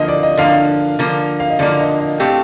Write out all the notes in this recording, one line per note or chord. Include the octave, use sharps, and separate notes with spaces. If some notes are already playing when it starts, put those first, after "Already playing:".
Already playing: D3 F3 A#3 D#5
D5
D#5
D3 F3 A#3 F5
D3 F3 A#3
F5
D#5
D3 F3 A#3 D5
D#5
D#5
A2 A3 C4 G4 F5